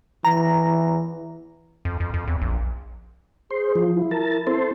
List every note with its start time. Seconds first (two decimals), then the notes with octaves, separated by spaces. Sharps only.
0.25 E3 A#5
1.85 F2
2.00 F2
2.14 F2
2.28 E2
2.42 A#1
3.51 G#4 C5
3.76 F3
3.94 E4
4.11 A#4 A5
4.47 C4 A4 C5